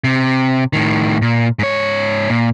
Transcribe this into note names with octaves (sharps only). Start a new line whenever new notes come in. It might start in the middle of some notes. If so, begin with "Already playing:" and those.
C3
A2 D#3
A#2
G#2 C#5
A#2